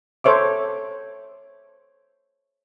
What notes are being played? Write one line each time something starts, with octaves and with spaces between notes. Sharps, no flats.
A4 C5 C#5 E5 D6